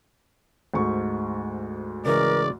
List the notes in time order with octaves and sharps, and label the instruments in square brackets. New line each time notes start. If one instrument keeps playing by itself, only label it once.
[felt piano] D2 G#2 C#6
[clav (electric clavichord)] C#3 E3 G#3 [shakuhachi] A#4 [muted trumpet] D5